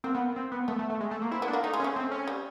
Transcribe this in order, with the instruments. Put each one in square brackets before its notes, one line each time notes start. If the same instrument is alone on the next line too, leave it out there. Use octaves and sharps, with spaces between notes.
[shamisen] A#3 [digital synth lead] C4
[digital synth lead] B3
C4
B3
[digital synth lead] A3 [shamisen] B3
[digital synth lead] A3
A3
G#3
A3
A#3
[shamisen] C4 [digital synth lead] E4
[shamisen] B3
[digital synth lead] D4
[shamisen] A#3
[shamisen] A3 [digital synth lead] D#4
[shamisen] G#3
[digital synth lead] C#4
[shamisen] A3
[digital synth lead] C4
C#4
[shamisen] G3